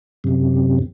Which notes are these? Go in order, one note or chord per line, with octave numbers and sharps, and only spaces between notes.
F#2 C3